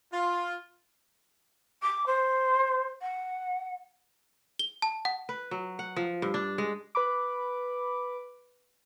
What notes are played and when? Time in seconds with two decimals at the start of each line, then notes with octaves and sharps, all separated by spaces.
0.13 F4
1.83 D6
2.06 C5
3.02 F#5
4.59 G7
4.82 A5
5.05 F#5
5.29 B4
5.51 F#3
5.79 F#5
5.96 F3
6.22 G2
6.34 D4
6.58 G#3
6.95 B4 B5 D6